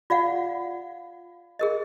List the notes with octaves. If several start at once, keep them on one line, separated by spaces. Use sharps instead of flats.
F4 D5 F5 F#5
G#4 A#4 D#5